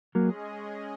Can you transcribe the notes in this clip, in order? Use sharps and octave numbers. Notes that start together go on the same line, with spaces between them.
F#3 G#3 A#3 C#4 G#4 D#5